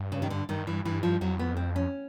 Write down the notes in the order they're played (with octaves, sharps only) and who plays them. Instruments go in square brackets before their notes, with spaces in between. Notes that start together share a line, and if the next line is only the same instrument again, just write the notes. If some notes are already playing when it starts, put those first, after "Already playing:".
Already playing: [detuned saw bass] G2
[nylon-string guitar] C#3
D#3
D3
[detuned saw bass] G2 [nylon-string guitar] D#3
[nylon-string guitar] E3
[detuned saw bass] G2 [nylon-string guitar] E3
[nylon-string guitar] F3
[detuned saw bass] F2 [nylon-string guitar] F#3
[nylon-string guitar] B3
C4
C#4